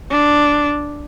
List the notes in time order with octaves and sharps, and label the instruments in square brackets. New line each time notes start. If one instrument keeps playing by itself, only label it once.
[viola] D4